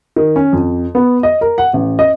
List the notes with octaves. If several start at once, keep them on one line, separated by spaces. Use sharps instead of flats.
D#3
C#4
F2
B3
D#5
A#4
F#5
A1
D#5